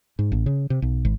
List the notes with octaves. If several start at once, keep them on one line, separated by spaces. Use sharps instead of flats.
G#2
A1
C#3
C3
B1
G#1